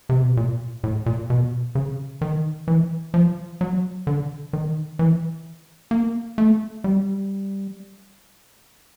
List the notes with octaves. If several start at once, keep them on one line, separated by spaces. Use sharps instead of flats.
C3
B2
A#2
A2
A#2
B2
C#3
D#3
E3
F3
F#3
D3
D#3
E3
A#3
A3
G3